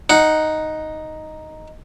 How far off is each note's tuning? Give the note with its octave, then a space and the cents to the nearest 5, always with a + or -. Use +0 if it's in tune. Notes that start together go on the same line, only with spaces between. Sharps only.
D#4 +0 F#5 +0